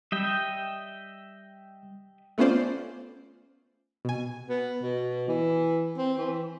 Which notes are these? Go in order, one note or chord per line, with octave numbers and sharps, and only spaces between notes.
G3 D#5 E5 G5
A3 B3 C#4 F4 C5 D5
B2 G#5
B3
B2
E3
C4
E3